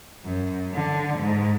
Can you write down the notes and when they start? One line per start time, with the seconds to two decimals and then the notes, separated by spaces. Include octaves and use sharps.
0.24 F#2
0.74 D3
1.19 G#2